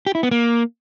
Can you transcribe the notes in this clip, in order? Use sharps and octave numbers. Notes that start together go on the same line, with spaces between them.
G4
E4
B3
A#3